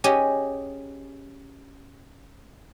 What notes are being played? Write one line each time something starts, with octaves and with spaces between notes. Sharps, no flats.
C#4 G4 G#4 D#5